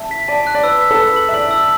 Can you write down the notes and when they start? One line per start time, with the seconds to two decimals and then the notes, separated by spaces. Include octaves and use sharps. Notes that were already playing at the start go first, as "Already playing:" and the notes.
Already playing: E5 A5
0.11 B6
0.28 D5 A5
0.47 F#6
0.55 D5
0.63 B4 E6
0.82 B6
0.91 A4
0.98 B4 E6
1.16 F#7
1.29 E5
1.33 D5 F#7
1.51 E6